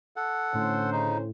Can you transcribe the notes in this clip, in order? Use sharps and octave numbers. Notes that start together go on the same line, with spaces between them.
A4 F#5
A2 D3 C#4 C5
C#3 D#4